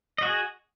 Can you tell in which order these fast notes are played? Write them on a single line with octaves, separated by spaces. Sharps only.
D#5 F#4 G#4